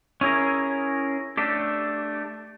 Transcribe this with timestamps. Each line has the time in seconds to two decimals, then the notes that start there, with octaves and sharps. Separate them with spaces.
0.21 C#4 E4 G#4 A#4
1.37 A3 D4 G4